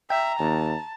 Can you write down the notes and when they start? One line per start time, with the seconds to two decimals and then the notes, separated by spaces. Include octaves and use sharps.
0.10 E5 G5 A#5
0.39 D#2 A5